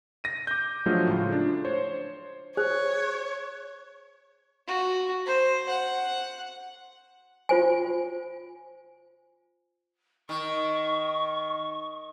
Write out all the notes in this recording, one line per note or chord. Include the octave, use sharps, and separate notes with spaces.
A#6 D#7
D6 G6
F3 F#3 G#3 A3 D4 F4
A2 C#3 F4
D4
C5 C#5
G#4 C5 C#5
F#4
C5
F#5
F4 C5 G#5
D#3 C#6